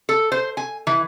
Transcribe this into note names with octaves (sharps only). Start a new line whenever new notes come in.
A4
C5
G#5
E3